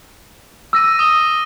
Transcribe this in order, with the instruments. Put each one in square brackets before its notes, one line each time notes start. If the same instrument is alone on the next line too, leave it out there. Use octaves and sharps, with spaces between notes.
[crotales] D6 A#6 D#7 [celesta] E6
[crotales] D#6 A#6 G7